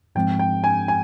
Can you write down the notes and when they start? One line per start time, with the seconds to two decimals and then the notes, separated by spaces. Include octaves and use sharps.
0.15 G#2 F3 G#3 C4 G5
0.39 G5
0.64 G#5
0.88 G#5